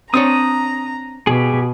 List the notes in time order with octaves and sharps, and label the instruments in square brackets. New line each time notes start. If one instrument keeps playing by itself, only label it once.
[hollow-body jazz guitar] C4 D4 C#5 [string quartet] A#5 [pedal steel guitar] D#6
[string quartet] B2 [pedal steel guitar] G4 G#4